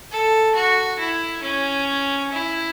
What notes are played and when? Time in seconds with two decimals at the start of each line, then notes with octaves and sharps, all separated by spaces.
0.11 A4
0.55 F#4
0.99 E4
1.43 C#4
2.32 E4